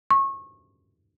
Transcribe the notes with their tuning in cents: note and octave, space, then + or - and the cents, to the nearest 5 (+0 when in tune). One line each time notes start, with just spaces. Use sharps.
C#6 -25